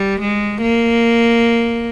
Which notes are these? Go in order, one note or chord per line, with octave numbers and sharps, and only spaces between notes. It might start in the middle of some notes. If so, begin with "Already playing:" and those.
Already playing: G3
G#3
A#3